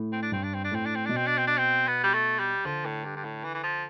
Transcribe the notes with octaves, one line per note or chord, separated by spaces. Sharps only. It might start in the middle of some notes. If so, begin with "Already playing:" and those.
Already playing: A2
C4
D4
G2 C4
D4
C4
D4
A2 C4
D4
C4
B2 D4
C4
D4
C4
D4
C4
B3
G3
A3
G3
D3 F3
A2
G2
G2
A2
E3
E3
F3